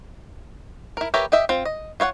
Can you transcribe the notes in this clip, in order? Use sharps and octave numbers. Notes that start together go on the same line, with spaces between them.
E4 A#4
G4 A#4 B4 C#5 E5
G4 D#5 E5
C4 F4
D#5
F4 C#5 F5 F#5